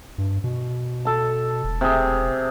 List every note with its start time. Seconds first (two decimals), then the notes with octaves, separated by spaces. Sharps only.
0.18 G2
0.44 B2
1.05 A4 A5
1.64 E1
1.81 C3 G#4